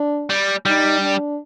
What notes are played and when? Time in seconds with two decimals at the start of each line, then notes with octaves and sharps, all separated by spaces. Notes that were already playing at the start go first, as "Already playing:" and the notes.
Already playing: D4
0.30 G3
0.65 G3 D#4
1.01 D4